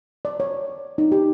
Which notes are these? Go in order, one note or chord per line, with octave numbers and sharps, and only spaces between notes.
D5
C#5
D#4
G4